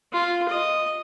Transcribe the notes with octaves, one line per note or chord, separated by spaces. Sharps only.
F4
D#5